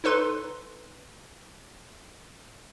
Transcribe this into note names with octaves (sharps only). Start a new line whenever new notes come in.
D#4 A4 B4 C6